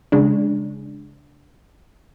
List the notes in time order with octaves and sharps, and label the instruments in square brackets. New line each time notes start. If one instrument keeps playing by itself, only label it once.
[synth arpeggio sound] C#3 G#3 D4